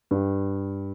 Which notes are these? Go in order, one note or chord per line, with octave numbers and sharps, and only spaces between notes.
G2